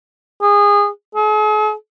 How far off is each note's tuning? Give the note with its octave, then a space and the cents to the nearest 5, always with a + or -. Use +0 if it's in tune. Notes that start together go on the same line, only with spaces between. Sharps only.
G#4 -25
G#4 +45